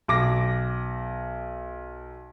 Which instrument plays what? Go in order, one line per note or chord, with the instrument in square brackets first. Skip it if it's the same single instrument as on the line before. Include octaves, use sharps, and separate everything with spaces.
[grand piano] B1 D6 A#6